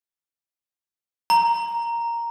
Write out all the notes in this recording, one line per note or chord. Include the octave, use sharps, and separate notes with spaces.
A#5